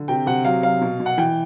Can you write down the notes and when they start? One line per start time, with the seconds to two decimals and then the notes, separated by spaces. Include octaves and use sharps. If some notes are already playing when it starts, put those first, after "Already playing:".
Already playing: D3
0.08 C3 G5
0.27 C3 F#5
0.45 F#3 F5
0.63 F#3 F5
0.82 B2
1.00 B2
1.06 F#5
1.18 E3 G5